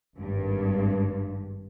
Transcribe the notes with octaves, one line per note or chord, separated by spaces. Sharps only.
G#1 G2